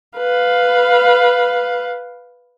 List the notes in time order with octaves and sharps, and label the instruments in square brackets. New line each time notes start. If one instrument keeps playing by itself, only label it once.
[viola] B4 F5